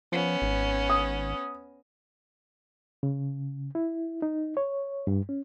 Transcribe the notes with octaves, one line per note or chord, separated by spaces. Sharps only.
F3 B3 C#4
G#1
D#6
C#3
E4
D#4
C#5
G2
C#4